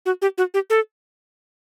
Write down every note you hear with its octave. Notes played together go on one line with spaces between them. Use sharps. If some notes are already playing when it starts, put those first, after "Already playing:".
F#4
G4
F#4
G4
A4